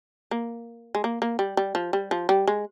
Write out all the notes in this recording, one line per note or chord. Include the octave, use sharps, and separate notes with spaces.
A#3
G#3
A#3
A#3
G3
G3
F3
G3
F3
G3
G#3